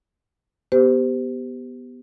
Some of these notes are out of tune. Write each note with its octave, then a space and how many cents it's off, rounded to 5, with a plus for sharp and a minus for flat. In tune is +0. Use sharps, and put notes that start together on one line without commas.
B3 +0 G4 +0 C5 -30